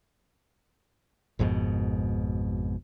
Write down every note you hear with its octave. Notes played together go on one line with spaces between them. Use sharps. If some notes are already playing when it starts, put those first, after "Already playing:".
G#1 F2 G#2 B2